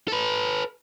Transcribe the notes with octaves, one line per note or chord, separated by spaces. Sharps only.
A4 B4